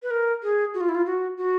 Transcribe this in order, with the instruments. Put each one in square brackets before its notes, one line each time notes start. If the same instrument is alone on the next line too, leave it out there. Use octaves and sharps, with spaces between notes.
[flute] B4
A#4
G#4
F#4
F4
E4
F4
F#4
F#4